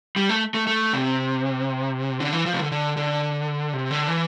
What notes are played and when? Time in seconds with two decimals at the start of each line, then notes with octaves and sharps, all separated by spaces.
0.16 G3
0.29 A3
0.54 A3
0.67 A3
0.93 C3
2.20 D3
2.33 E3
2.46 F3
2.53 C3
2.58 D3
2.72 D3
2.97 D3
3.73 C3
3.91 D3
4.08 E3